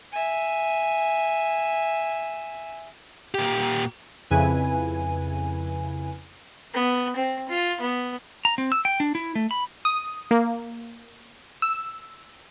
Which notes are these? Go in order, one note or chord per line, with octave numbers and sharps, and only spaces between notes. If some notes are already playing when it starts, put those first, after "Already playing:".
E5 G#5
A#2 G4
F2 C#3 E4 B4 G#5
B3
C4
F4
B3
A#5
C4
E6
G5
D4
E4
A3
B5
D#6
A#3
E6